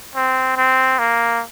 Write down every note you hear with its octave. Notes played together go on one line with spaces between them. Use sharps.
C4
C4
A#3